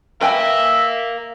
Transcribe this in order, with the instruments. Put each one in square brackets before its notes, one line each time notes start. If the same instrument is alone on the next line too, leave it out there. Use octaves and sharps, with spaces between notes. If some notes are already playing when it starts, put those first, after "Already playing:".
[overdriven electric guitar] A#4 F5 [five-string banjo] B4 G5 G#5 [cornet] E5